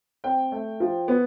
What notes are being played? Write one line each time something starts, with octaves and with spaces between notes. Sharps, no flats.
C4 G5
A3
F3
B3